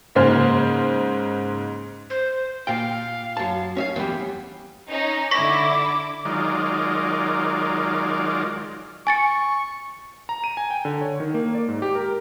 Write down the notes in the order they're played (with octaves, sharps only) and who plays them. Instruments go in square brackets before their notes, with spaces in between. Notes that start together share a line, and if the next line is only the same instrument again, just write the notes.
[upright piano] G#2 C#3 A#3 C5 F6
[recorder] C5
[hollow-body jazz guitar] A#2 G5 [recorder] F5
[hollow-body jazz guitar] F#2 A5
C#4 E5 F5
E2 G3
[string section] C#4 D#4
[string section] D3 E4 [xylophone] C#6 A#6 B6 [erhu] D6
[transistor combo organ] D#3 F#3 G#3 F4 A#4 D5
[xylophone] G#5 A6 C#7 [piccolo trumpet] C#6
[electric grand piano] A#5
D#7
G#5
G5
D3
C#5
D#3
A#3
D5
G#2
G4
A#4